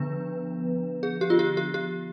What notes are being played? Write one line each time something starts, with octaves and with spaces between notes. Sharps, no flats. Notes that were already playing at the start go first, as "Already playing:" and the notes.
Already playing: D3 F3 B3 D4 B4
G#4
G4
F4
G4
G4
G4